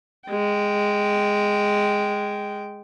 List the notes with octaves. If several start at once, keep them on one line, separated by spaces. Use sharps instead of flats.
G#3 G5